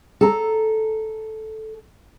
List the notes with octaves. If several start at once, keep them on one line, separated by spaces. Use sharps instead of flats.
A4 A#5